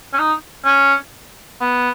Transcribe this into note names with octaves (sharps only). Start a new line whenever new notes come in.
C#4
D#4
C#4
B3